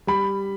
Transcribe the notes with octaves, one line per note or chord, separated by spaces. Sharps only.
G3 B5